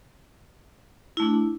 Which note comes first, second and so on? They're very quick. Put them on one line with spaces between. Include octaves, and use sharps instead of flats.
E4 A3 D4